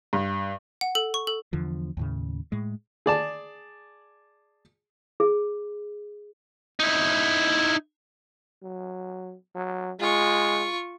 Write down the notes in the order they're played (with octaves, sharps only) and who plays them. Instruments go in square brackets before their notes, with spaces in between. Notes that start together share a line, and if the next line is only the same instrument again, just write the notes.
[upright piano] G2
[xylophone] F#5
A4
C#6
A4
[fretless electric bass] E2 D3 F3
D#2 A2 C#3
A2 G#3
[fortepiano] G#4 D5 A5
[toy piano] G#4
[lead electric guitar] D#4 E4
[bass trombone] F#3
F#3
[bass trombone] G#3 [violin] F4 C#6